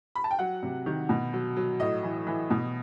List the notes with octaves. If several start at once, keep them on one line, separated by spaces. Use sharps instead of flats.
B5
A5
G5
F#3 F#5
C3
D#3
B2
F#3
F#3
A2 D#5
E3
E3
B2